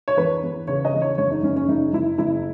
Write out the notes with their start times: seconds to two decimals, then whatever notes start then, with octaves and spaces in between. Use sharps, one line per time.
0.08 C#5
0.17 E2 B4
0.43 E2
0.68 C#3 C#5
0.85 D#5
0.93 E2
1.02 C#5
1.18 F#1 C#5
1.31 D#4
1.43 F#1 C#4
1.56 C#4
1.68 F#1 D#4
1.93 F#1 E4
2.18 F#1 E4